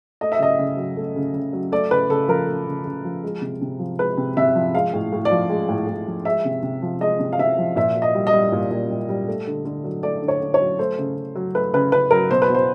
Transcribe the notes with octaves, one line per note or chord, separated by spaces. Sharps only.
A3 D#5
E5
C#3 D#5
C#3
F#3
A3
C#3
C#3
F#3
A3 D5
C#3 B4
C#3 A4
F3 A#4
A3
C#3
C#3
F3
G#3
C3
C3
F3
G#3 B4
C3
C3 E5
F3
G#3 F5
A2
A2
D5
F3
G#3
A2
A2
F3
G#3 E5
C3
C3
F3
G#3 D#5
C3
F5
C3 E5
F3
A#2 E5
A#2
D#5
G3
D#5
G3
A#2
A#2
G3
G3
A3
D3
D3
F#3
A3 D5
D3
C#5
D3
C#5
F#3
A3 C5
C#3
C#3
F#3
A3 B4
C#3 B4
C#3 B4
F#3 A#4
B2 C5
B4
B2
C5